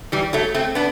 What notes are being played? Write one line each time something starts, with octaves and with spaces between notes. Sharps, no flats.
E3 G3
F#3 A3
A3 C4
B3 D4